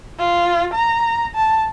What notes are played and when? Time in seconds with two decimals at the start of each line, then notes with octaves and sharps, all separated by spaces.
0.19 F4
0.73 A#5
1.35 A5